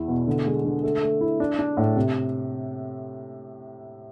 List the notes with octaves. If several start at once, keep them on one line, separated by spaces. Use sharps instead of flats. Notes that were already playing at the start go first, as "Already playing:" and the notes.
Already playing: E2 E4
B2
D3
G#3
D3
A3
A3
E4
D4
D4
A2
C3